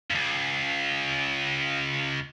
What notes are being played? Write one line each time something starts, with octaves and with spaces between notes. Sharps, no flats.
C#2 G2